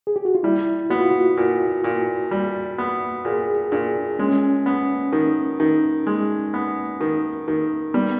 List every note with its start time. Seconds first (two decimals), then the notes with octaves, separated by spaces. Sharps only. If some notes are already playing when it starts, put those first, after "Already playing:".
0.07 G#4
0.16 G4
0.25 F#4
0.35 F4
0.43 G3 E4
0.90 B3 F#4
1.00 F4
1.11 F#4
1.37 A#2
1.84 A#2
2.31 G3
2.78 B3
3.25 A#2 G#4
3.72 A#2 D4
4.19 G#3 C#4
4.66 B3
5.13 D#3
5.60 D#3
6.07 G#3
6.54 B3
7.01 D#3
7.48 D#3
7.94 G3 B3